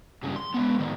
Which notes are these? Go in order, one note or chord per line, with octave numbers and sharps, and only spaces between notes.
G2 C#3
C6
G#3 B3
A2 D#3